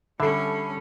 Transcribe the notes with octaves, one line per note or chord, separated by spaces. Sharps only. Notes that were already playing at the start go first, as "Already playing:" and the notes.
D3 G3 C#4 A4 E5 B5 C7